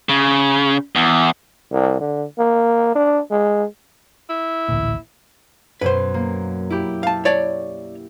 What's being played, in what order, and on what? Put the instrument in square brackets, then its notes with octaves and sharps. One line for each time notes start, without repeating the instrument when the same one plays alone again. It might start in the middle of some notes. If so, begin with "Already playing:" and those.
[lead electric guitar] C#3
E2
[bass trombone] C2
D3
A#3
D4
G#3
[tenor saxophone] E4
[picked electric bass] A1 D2 A#2
[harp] F#2 B2 [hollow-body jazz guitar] B4 C5
[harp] A#3
E4 G4
[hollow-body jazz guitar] F5 A5
C#5 D5 A5